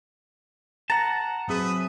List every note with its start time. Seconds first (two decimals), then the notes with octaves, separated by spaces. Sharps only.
0.90 F#5 A5 A#5
1.48 F#3 C4 G#4 B4 E5 D#6